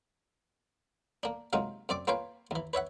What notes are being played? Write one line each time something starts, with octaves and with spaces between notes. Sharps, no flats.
A#3 D4
C3 F#3 G#3 A#3 D#4 F4
F#2 C4 D5 D6
A#3 F4 B4 C#5 F5 G5
D#2 E3
B4 C#5 E5 F#5